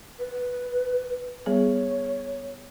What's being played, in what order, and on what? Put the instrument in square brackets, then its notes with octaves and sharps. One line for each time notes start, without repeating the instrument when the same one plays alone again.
[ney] B4
[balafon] G3 B3 G#4 [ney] C#5